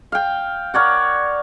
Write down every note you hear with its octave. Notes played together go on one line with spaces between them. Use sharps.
F5 G5
A#4 C#5 D5 F#5